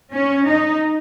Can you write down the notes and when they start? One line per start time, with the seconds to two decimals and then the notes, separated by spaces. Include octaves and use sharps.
0.12 C#4
0.46 D#4